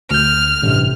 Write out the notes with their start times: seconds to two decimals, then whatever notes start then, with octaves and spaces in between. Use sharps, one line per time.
0.11 D2 F6 G6
0.62 A1 G2 C3